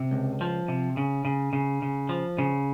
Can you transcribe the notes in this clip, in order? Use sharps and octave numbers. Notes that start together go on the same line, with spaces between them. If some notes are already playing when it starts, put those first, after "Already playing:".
Already playing: C3
C#2
F3
C3
C#3
C#3
C#3
C#3
F3
C#3